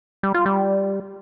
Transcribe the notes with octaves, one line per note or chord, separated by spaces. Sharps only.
G3
F4
G3